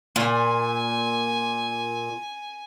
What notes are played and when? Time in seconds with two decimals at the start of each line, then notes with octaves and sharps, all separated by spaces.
0.16 A#2 G#5